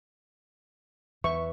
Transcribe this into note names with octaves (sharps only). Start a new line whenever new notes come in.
E2 B4 E5 C#6